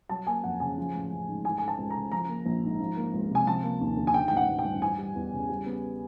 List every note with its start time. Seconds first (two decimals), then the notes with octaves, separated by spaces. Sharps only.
0.09 F#3 A5
0.27 A#3 G#5
0.44 F2 F#5
0.60 C#3 G#5
0.78 F3
0.95 A1
1.11 A1
1.29 G#2
1.45 E3 G#5
1.58 A3 G#5
1.68 A5
1.78 C#2
1.90 C#3 A#5
2.12 F3 A#5
2.29 A#3
2.46 A#1
2.63 G#2
2.80 F3
2.97 A#3
3.13 C#2
3.31 C3 G#5
3.47 F3 A5
3.64 A#3
3.81 D#2
3.97 D3
4.07 G#5
4.14 D#3 G5
4.28 A1 G5
4.37 F#5
4.48 A1
4.59 G5
4.65 G2
4.82 E3 G#5
4.98 G3
5.15 E2
5.33 C#3
5.50 G3
5.66 B3